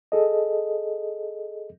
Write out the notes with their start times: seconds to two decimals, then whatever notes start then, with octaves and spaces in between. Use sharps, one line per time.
0.12 G#4 A4 D#5